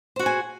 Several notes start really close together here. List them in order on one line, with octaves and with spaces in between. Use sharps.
C5 F#4 G#4 G#5